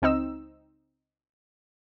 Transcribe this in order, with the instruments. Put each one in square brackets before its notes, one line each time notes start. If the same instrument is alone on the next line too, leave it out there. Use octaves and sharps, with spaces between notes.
[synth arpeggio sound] C#2 C4 D#4 E6